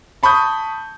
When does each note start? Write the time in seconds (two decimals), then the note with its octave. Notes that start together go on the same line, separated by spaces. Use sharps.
0.23 A5 B5 C#6 D#6 G6